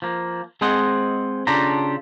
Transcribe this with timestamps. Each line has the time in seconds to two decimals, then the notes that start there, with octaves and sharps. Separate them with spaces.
0.02 F3 A#3
0.61 G#3 C4 G#4 C5 D#5 F#5
1.47 C#3 D4 F4 G4 A4 A#5